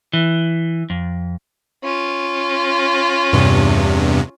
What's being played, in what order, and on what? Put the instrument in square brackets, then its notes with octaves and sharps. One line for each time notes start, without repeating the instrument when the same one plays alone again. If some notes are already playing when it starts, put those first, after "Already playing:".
[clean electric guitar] E3
F2
[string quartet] C#4 F4
[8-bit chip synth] E2 G2 C3